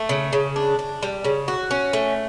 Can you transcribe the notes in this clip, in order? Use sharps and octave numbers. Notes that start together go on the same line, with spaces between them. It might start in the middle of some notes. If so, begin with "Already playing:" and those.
Already playing: A3
C#3
C#3
D4
D4
G3
C#3
F#4
C#4
A3